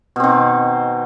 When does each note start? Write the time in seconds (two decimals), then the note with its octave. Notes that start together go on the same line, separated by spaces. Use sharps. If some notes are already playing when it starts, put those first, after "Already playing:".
0.16 B2
0.20 C4
0.24 D#3